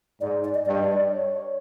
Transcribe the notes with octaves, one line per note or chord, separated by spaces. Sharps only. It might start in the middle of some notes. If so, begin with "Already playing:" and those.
G#2 D5
D5
D#5
G2 D5
D#5
D5
C#5